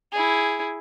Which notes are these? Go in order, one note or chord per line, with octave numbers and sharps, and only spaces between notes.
E4 G#4